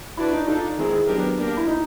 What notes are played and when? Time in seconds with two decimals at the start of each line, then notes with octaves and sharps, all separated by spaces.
0.17 D4 E4 F#4 B4 D5
0.33 D#4
0.48 D4 D#4 F4 A4
0.78 D#3 G#3 C4 E4 G#4
1.08 F#3 B3 D4 G4 A#4
1.38 A#3 D4 G4 A#4
1.57 E4
1.67 D#4